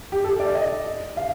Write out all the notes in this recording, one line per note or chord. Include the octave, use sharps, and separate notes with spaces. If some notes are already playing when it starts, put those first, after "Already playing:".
G4
A4
D5
D#5
F5